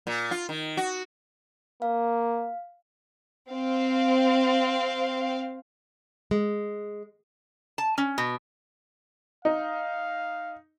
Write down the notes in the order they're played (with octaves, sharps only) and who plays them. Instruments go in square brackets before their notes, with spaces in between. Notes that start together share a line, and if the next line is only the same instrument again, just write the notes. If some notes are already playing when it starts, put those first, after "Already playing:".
[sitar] A#2
F4
D#3
F#4
[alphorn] A#3 [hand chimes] F5
[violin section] C4 F5
[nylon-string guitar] G#3
[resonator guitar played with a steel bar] A5
C#4
B2
[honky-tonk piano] D#4 [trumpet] F5